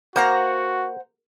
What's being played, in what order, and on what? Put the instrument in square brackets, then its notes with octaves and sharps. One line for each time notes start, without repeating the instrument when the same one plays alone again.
[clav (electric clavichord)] A#3 [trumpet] F#4 [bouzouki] C5 F#5 A#5